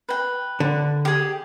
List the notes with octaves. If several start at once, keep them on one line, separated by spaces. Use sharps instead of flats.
B4 G5
D3
G4 G#4